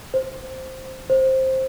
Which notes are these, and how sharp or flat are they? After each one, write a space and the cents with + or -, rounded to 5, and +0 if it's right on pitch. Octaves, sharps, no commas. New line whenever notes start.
C5 +0
C5 +10